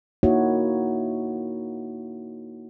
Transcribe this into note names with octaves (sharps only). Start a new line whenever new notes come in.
A#3 D#4 E4 F#4 C#5